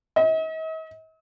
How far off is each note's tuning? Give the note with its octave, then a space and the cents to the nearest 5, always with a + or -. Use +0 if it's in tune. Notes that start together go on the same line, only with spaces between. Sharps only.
D#5 +45